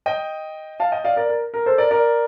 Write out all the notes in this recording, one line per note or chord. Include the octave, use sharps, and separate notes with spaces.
D#5 G5
F5 A5
D#5 G5
D5 F5
A#4 D5
A#4
A#4
A4 C5
A#4 D5
A#4 D5